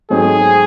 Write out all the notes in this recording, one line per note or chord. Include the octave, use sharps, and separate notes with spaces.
G#2 F#3 C4 D#4 G#4 A4